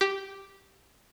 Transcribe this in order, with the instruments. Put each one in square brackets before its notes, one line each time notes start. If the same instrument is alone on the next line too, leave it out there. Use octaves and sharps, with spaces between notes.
[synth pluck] G4